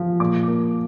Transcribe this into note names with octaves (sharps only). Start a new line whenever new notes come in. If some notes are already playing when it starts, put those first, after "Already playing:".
Already playing: F3
A#2 D6
A#3